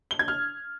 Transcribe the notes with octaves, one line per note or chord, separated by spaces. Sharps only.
G7
G#6
F6